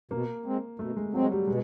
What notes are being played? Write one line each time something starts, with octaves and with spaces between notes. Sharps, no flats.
B2 A#3
G#3 C4
B2 A3
G#3
F#3 G#3 C4
G3
B2 G#3